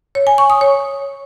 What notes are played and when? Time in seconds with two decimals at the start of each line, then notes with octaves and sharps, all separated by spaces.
0.15 C#5
0.27 G#5
0.38 C#6
0.50 D#6
0.61 C#5